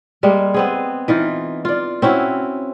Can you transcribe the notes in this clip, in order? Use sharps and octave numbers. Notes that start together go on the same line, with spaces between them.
G3 G#3 A#3
B3 C4 G#4
E3 D#4 F4
F4 D5
C4 C#4 E4 F#4